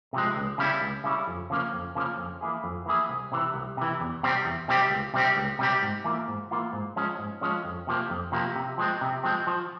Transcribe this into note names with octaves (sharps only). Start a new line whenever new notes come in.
C3 F3 G#3
C#2
C#3 G3 C#4 E4
C#2
C#3 G3 C#4 E4
F2
C#3 F3 A#3 C#4
F2
C#3 F3 A#3 C#4
F2
E3 A#3 E4 G#4
F2
E3 A#3 E4 G#4
C2
C3 E3
C2
C3 E3
E2
C3 G3 C4 G4
E2
C3 G3 C4 G4
C#2
C3 G3 C4 G4
C#2
C3 G3 C4 G4
G#2
E3 A#3 F4
G#2
E3 A#3 F4
G#2
F3 G#3 C#4
G#2
F3 G#3 C#4
F2
C3 F3 A#3
F2
C3 F3 A#3
C3
F3 G#3 C4
C3
F3 G#3 C4
F3